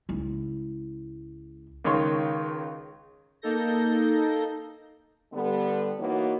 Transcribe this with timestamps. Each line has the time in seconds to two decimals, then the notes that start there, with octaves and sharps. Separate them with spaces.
0.09 C#2 E4
1.84 C#2 D#3 C#5 C6 C#6
3.42 A#3 D#4 A4 G6 A#6
5.33 D3 G3 B3
5.99 E3 A#3 B3 D#4 F#4 C#5